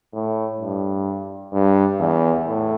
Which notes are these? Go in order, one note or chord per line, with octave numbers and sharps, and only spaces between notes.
A2
G2
G2
E2
A2